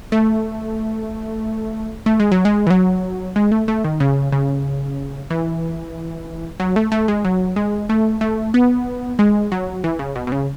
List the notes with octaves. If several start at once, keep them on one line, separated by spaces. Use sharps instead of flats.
A3
A3
G#3
F#3
G#3
E3
F#3
G#3
A3
A3
D#3
C#3
C#3
E3
F#3
A3
A3
G#3
F#3
G#3
A3
A3
B3
G#3
F#3
E3
C#3
B2
B2
C#3